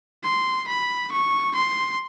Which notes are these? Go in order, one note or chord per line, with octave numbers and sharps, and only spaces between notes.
C6
B5
C#6
C6